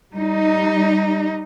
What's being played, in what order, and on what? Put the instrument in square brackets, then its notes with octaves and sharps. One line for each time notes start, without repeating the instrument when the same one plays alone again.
[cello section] G3 D#4